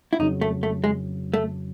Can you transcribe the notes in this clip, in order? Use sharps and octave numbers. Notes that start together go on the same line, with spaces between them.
E4
F2 C#3 F#3 D#4
A3
A3
G#3
A3